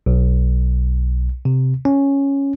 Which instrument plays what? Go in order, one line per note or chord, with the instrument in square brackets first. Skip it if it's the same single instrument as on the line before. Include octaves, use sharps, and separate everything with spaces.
[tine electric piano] B1
C3
C#4